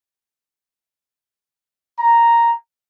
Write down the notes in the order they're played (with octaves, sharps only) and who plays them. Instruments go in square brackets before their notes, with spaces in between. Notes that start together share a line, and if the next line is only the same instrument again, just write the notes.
[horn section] A#5